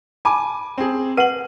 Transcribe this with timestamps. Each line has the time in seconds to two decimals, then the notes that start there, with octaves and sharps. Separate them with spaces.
0.25 G#5 A5 B5 D6
0.78 C4 G#4
1.17 B4 F#5 D#7 F#7